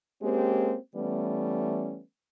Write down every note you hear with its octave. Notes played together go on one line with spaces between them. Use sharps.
G#3 A#3 C4 C#4 G4
E3 G3 A3 B3 C#4